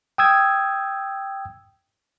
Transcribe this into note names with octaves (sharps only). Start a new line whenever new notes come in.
G5 D#6 E6 G#6